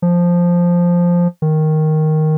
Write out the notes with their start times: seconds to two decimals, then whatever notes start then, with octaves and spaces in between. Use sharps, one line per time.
0.02 F3
1.42 D#3